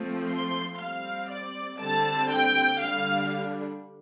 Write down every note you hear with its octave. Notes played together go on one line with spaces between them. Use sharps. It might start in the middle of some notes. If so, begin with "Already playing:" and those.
Already playing: F3 A3 C4
C6
G3 C4 F5
D5
D3 G3 C4 A5
G5
D3 G3 D4 F5